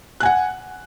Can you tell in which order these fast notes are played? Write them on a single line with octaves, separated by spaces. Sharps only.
F#6 G#5 F#5